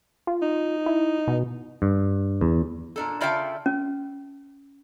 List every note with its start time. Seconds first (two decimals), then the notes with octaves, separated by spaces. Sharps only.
0.27 F4
0.42 D#4
0.86 E4
1.28 B2
1.82 G2
2.41 E2
2.96 A#2 D4 A4
3.21 C#3 F4 D5 E5 G5 A5
3.66 C#4